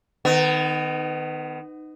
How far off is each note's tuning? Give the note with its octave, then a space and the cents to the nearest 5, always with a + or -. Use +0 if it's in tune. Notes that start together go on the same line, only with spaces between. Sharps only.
D#3 -15 B3 +30